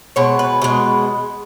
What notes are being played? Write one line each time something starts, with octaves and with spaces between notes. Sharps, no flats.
B2 G#3 C#5
B4
B2 G#3